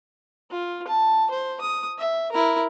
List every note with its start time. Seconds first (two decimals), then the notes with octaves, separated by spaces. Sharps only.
0.51 F4
0.87 A5
1.31 C5
1.61 D#6
1.98 E5
2.32 E4 A#4